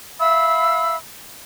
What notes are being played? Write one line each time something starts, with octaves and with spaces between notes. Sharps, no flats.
E5 F5 B5 E6